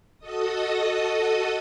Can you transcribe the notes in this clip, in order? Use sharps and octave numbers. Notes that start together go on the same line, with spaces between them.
F#4 A4 D#5 D#6